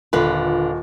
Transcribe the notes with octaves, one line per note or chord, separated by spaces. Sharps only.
D#1 D3 F4 B4